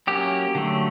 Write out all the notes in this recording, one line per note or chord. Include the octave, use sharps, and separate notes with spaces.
F#3 A#3 C#4 G4
D3 F#3 A3